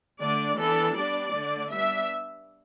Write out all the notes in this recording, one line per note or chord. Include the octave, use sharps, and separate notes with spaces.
D3 A3 D4 D5
E3 B3 D4 A4
G3 B3 D4 D5
D3 A3 D4
G3 B3 D4 E5